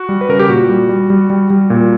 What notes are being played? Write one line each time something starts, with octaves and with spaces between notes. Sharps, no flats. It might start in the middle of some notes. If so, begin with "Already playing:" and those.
Already playing: F#4
G3
B4
C#3 A#4
G4
A#2 F#4
G3
G3
G3
G3
G3
A#2